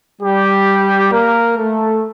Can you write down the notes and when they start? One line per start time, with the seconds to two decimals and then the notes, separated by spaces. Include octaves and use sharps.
0.22 G3 G4
1.12 A#3 A#4
1.57 A3 A4